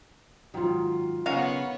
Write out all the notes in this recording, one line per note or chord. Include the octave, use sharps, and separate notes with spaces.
G#2 D#3 F#3 F4
C#3 B3 C#4 D#4 A#4 C#5 F5 F#5